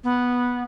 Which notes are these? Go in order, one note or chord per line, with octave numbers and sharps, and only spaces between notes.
B3